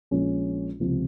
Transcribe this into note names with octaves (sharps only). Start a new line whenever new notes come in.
A#1 A#2 G#3 C#4
C#2 C3 F3